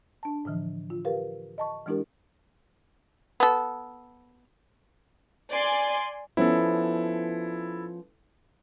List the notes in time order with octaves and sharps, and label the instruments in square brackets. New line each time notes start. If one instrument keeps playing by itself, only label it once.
[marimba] D4 A5
A2 D3 E3 F3
F4
G4 A#4 B4 F5
D#5 A5 C#6
E3 G#3 D4 E4 G4 A#4
[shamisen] B3 A4
[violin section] D5 G#5 C6
[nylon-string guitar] F3 B3 C#4 [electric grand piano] E4 A4